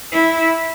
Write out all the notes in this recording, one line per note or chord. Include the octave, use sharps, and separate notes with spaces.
E4